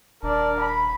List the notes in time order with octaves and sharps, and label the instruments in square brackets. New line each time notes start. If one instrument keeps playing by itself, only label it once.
[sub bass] D#1 [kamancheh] D4 D5 [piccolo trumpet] A#4
[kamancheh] B5